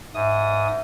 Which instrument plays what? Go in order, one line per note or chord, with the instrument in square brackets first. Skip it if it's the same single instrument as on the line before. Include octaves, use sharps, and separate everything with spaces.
[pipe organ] G#2 D#6 [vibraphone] E5